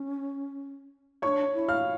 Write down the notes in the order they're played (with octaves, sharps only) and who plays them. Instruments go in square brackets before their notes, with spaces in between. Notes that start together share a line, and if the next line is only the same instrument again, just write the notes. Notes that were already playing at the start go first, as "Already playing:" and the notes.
Already playing: [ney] C#4
[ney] E4 [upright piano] C#5 C#6
[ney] D4
E4
[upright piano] F5 F6